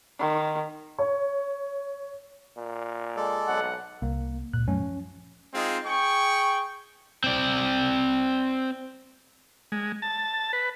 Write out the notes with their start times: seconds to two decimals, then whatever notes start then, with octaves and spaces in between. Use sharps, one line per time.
0.20 D#3
0.99 C#5
2.56 A#2
3.17 G#3 A4 D5
3.48 B1 F#5
4.02 C2 A#3
4.53 C#2 A#2 F#6
4.68 F#2 F#3 A3 C#4
4.80 F3
5.54 G#3 C4 D#4 F4 G#4
5.86 G#4 G5 C#6
7.24 C4 D5
9.72 G#3
10.02 A5
10.53 B4